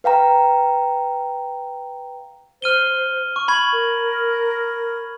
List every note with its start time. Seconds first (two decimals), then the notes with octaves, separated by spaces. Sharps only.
0.04 B4 F5 G5 A#5
2.62 C5 F6 D#7 G7
3.36 C#6
3.48 B5 C#6 G#6 F#7
3.73 A#4